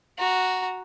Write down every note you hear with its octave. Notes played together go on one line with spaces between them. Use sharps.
F#4 A#5